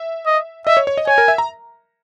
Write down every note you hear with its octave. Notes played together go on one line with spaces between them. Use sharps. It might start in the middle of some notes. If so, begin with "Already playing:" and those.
Already playing: E5
D#5
D#5 E5
C#5
C#5
D#5
C#5 G#5
A#4
E5
A#5